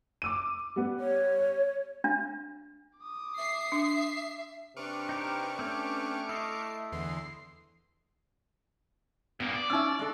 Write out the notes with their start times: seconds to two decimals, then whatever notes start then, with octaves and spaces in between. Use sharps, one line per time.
0.22 D6 E6 D#7
0.76 G3 B3
1.00 C#5
2.04 D4
2.99 D6 D#6
3.38 E5 C7
3.72 D4
4.77 C3 D4 B4 C#6 D6 F6
5.09 D#4 G4 A#4
5.59 A3 C4 C#4 G4
6.29 E4 D#5 C7
6.92 E2 D3 E3 C6
9.40 G2 A#3 B3
9.55 D5
9.70 C#4 D#4 E5 E6
9.99 G#3 D4 A4